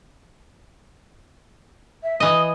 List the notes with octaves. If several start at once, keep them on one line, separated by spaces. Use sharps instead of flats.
E5
E3 D#5 D#6